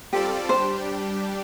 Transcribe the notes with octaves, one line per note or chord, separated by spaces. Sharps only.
G3 C4 F4 G4 A4 D5
G3 D4 G4 C5